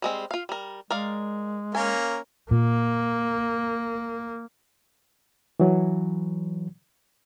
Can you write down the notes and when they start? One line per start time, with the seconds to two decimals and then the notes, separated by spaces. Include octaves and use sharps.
0.02 G3 G#3 C4
0.31 F4 F5
0.49 G3 A#4
0.90 G#3 A#4 D5 F5
1.75 A#3 C#4 A#4 G#5
2.51 A#2 A#3
5.60 E3 F#3